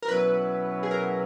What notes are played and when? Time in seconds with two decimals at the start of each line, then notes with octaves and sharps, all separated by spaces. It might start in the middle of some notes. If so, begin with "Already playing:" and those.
0.02 A#4
0.08 B2 F#3 C#4 E4 B4
0.83 G#4
0.91 A#4